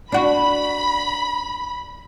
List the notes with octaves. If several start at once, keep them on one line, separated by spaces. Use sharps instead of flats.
D4 F#4 B5